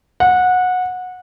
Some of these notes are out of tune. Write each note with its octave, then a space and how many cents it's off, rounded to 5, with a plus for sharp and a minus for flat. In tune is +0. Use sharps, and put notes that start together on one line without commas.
F#5 -20